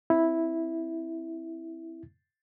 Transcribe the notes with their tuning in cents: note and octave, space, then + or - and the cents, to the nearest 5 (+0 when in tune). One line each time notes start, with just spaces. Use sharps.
C4 +0 E4 -5